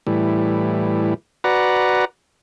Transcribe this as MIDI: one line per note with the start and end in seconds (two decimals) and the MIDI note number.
0.07 1.14 45
0.07 1.14 52
0.07 1.14 55
1.44 2.05 66
1.44 2.05 71
1.44 2.05 74
1.44 2.05 78
1.44 2.05 82